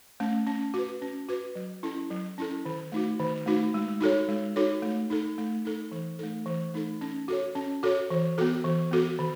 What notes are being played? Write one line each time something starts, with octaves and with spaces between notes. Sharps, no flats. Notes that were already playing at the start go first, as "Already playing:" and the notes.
A3 C#4
C#4
F#4 B4
C#4
F#4 B4
F#3
C#4 E4 A4
F#3
C#4 E4 A4
D#3
A3 D#4 F#4
D#3
A3 D#4 F#4
G#3
D#4 F#4 A4 C#5
G#3
D#4 F#4 A4 C#5
A3
D#4 A4
A3
D#4 A4
E3
A3 D#4 A4
E3
A3 D#4 A4
C#4
F#4 A4 C#5
C#4
F#4 A4 C#5
E3
B3 F#4 A4
E3
B3 F#4 A4
D#3